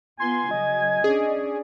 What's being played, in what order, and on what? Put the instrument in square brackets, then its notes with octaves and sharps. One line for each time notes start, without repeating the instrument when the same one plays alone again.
[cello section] B3 F4 [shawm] G#5 [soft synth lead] C6
[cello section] C#3 F#3 [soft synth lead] D#5
[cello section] C#4 D4 D5 [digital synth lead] G#4